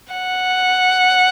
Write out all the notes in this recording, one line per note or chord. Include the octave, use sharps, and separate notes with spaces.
F#5